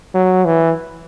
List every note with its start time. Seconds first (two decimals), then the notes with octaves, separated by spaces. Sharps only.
0.14 F#3
0.45 E3